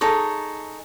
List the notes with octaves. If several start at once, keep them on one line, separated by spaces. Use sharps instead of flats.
D#4 G#4 A4 C#5